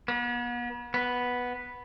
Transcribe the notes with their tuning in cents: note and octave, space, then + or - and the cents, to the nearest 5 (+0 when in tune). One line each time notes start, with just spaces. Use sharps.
B3 -40
B3 -5